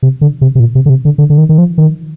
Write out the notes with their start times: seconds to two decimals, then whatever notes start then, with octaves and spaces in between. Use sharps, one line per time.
0.03 C3
0.21 D3
0.41 C3
0.55 C3
0.60 A#2
0.75 C3
0.86 D3
0.90 C3
1.05 D3
1.18 D3
1.30 D3
1.38 D#3
1.49 D#3
1.58 F3
1.78 D#3